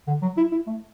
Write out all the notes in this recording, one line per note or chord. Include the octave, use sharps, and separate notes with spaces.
D3
F#3
E4
E4
A3